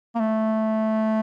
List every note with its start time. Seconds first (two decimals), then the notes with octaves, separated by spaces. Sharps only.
0.15 A#3
0.20 A3